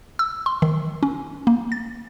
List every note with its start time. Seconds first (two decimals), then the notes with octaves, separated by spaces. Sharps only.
0.19 E6
0.46 C6
0.62 D#3
1.03 C#4
1.47 A#3
1.72 A6